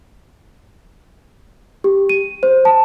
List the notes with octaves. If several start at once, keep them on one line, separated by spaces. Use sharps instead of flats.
G4
D#7
C5
A5